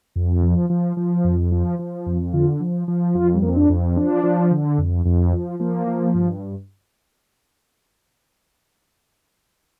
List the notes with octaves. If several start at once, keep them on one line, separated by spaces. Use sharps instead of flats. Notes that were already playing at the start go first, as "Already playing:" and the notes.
F2
F3
F3
F3
F2
F3
F3
F2
D3 F4
F3
F3
F2 F4
G3
F2 A#3
C4
D4
F2
F3 D4
F3
D3
F2
F2
F3
F3 A#3
F3
G2